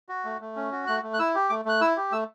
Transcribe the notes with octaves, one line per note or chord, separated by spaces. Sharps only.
F#4
A3
A3
C#4
F#4
A3 F#6
A3
F#6
E4 E6
G4
A3 D6
A3 F#6
E4 E6
G4
A3 E6